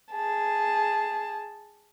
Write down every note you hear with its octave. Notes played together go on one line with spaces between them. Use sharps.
G#4 A5